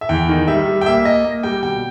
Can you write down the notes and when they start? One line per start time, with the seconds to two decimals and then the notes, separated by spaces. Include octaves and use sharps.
0.01 E5
0.09 E2 G5
0.29 D#3
0.48 G3 E5
0.67 G3
0.81 G5
0.86 A#3 E5
1.05 A#3 D#5
1.24 A#3
1.43 G3 G5
1.62 B2 G5